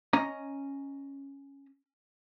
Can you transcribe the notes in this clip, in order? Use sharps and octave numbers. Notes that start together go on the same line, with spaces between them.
C#4 D#5 A#5